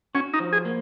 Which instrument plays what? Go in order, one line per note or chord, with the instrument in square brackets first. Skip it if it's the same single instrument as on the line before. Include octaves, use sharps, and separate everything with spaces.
[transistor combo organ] C#4 [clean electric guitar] F#4
[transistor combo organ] D#4
[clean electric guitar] F3
[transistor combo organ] G#4
[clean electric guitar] A#3